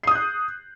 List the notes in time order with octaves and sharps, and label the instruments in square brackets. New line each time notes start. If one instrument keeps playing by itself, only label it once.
[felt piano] C7
D#6
G6
F#6